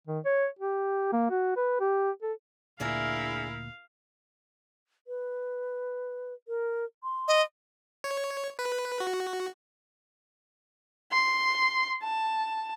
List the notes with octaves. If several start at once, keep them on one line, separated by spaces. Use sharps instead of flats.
D#3
C#5
G4
A#3
F#4
B4
G4
A4
D2 A#2 D4 E4 G#4 A#4 E5 F5
B4
A#4
C6
D#5
C#5
B4
F#4
C6
A5